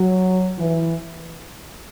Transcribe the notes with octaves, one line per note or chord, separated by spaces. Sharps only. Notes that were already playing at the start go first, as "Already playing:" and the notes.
Already playing: F#3
E3